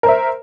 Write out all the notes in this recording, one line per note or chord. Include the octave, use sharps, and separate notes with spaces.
A#4 C5 E5